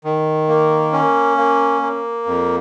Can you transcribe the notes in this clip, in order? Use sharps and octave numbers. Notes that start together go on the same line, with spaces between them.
D#3
A#3
C#4
A#3
A#3
F2